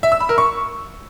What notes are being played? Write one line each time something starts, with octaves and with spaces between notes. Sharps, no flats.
E5
E6
B5
A#4
C#6